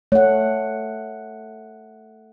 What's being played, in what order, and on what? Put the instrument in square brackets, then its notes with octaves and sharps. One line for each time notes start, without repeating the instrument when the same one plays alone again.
[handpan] A3 F#5 [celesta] C#5